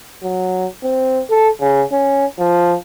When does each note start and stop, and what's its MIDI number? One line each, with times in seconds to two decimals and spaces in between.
0.23 0.66 54
0.83 1.21 60
1.30 1.49 69
1.61 1.83 49
1.92 2.25 61
2.39 2.75 53